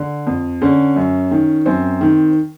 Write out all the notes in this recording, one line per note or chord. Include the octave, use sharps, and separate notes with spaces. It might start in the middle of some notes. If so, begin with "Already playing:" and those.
Already playing: D3
F2
D3 C#4
F#2
D#3
F#2 C4
D#3